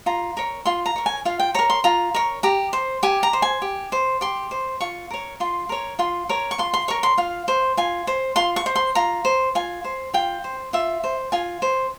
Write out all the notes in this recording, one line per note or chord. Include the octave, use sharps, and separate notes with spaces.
F4 A#5
A#4 C#5
F4 C6
A#5
A#4 C#5
G#5
F4 F5
G5
A#4 C#5 A#5
C6
F4 A#5
A#4 C#5
G4 A#5
C5
G4 G#5
A#5
C5
G#5
G4
C5
G4 C6
C5
F4 C#6
A#4 C#5
F4 C6
A#4 C#5
F4 C6
A#4 C#5
C#6
F4 C6
C6
A#4 C#5 C#6
C6
F4 F5
C5
F4 G#5
C5
F4 C6
C#6
C5
C6
F4 A#5
C5
F4 G#5
C5
F4 G5
C5
F4 E5
C5
F4 G#5
C5